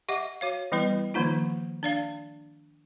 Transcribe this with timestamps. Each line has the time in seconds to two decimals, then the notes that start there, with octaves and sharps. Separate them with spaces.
0.09 G4 D#5 E5 F#5 D6
0.41 F#4 C#5 F5
0.72 E3 G3 B3 E4 B4
1.14 D#3 F3 A#3 D#4 F4
1.83 D4 D5 F5